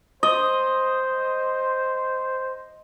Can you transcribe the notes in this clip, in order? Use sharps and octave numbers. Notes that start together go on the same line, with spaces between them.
C5 D#5